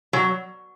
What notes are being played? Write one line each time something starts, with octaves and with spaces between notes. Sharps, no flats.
F#3